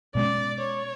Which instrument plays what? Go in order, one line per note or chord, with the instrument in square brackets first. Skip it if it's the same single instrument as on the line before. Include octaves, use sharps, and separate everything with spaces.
[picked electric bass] B2 G#3 C#4 [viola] D5
[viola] C#5